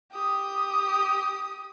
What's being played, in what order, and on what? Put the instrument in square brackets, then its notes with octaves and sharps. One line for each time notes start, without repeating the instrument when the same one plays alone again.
[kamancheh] G4 D#6